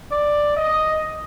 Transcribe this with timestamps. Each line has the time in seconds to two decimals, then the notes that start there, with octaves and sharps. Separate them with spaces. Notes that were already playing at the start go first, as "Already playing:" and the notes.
0.11 D5
0.56 D#5